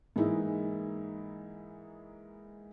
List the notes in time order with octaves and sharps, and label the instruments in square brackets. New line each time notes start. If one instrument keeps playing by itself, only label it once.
[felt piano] G#2 E3 G#3 A#3 D#4 E4